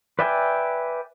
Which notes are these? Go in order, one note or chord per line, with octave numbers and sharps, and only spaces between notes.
B4 D5 E5 G5 G#5